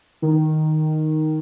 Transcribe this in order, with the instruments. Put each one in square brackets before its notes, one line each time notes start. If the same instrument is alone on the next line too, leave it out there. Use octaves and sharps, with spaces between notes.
[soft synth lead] D#3